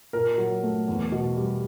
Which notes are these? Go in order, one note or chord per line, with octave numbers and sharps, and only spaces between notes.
A#2 A#4
F#3
A3
E2
B2
G3